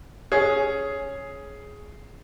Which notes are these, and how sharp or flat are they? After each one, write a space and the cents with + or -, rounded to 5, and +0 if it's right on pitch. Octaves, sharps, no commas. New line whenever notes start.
C#4 +0 G#4 +10